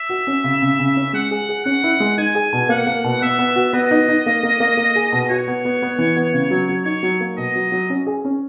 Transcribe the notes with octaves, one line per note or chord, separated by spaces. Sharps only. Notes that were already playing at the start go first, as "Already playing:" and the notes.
Already playing: E5
F#4
C#4
C#3
C#3
C#3
C#4
G#3 F#5
G#4
G#4
C#4 F#5
E4
G#3
D#4 G#5
G#4
B2
A#3 F#5
A#3
B2
B3 E5
B3
F#4
B3 D#5
D#4
D#4
A#3
A#3
A#3
A#3
G#4
B2
F#4 C#5
B3
B3
B3
E3
B3
C#3
F#3
F#3
D#4 C#5
F#3
A#3
B2 D#5
F#3
F#3
C#4
G#4
C#4